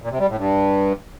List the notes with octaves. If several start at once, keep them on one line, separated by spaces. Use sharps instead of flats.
A#2
C3
G3
A2
G2